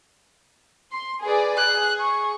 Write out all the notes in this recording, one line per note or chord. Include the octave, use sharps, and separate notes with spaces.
C6
G#4 B4 D5
G#4 F#6
C#6